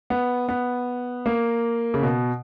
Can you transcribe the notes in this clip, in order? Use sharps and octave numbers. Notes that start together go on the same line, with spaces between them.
B3
B3
A#3
C#3
B2